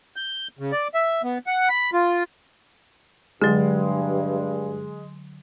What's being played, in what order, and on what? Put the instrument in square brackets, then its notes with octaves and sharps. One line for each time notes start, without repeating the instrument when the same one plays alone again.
[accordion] G6
C#3
D5
E5
B3
F#5
B5
F4
[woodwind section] G2 [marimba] D3 F#3 [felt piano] G#3